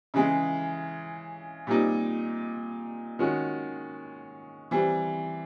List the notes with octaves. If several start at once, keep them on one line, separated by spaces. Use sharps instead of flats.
C#3 E3 G#3
A#2 G3 C4 D#4
D#3 G#3 C#4 F#4
E3 G3 C4